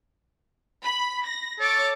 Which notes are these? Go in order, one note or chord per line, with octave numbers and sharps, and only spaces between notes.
B5
A#6
A4 C#5 D6 A6